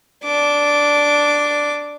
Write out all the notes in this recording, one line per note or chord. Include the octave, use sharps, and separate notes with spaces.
D4 D6